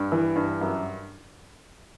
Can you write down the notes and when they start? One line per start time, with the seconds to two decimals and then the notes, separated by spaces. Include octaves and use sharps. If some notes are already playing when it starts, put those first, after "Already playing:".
Already playing: G2
0.12 E3
0.36 G2
0.61 F#2